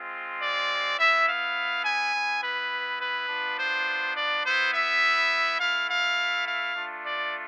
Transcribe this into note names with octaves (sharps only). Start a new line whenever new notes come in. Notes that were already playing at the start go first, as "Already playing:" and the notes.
Already playing: G#3 C4 F4
D5
B3 E4 E5
F5
G#5
B3 E4
B4
B4
B3 D4 F4
C5
D5
B3 E4 C5
E5
A3 E4 F5
F5
F5
A3 D4 F4
D5